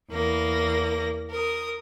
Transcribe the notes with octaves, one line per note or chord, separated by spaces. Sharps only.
E2 A#3 A#6
A#4 D#6